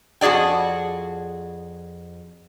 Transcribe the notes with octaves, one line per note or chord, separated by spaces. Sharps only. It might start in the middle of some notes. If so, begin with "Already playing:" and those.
F2 F#4 G#4 D5 G5